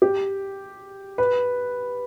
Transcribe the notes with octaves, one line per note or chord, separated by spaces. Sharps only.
G4
B4